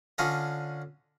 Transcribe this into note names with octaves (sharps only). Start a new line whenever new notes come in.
D3 C#4 D4 F4 C#5 D#5